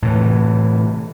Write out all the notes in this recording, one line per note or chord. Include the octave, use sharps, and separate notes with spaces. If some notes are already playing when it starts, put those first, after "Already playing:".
A2 C3 E3